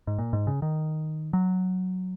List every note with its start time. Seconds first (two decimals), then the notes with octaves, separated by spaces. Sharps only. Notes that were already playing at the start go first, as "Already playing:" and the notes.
0.07 G#2
0.19 A#2
0.33 G#2
0.47 C#3
0.62 D#3
1.33 F#3